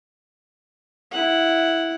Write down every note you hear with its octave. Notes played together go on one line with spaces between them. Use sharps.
E4 F#5